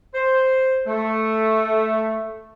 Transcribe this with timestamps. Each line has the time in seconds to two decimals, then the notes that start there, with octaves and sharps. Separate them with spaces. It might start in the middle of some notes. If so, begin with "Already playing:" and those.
0.14 C5
0.87 A3